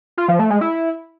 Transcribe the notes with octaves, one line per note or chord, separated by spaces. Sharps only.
F4
F3
A3
G#3
E4